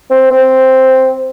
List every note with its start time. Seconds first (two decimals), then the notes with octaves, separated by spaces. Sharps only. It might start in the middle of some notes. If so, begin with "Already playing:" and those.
0.10 C4
0.31 C4